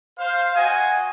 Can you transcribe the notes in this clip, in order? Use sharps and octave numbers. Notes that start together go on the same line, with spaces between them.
C5 F5
F#4 D#5 G#5